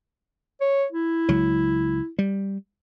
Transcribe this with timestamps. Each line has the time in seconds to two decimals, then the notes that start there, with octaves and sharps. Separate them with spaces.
0.61 C#5
0.92 E4
1.29 C#2 F#3
2.19 G3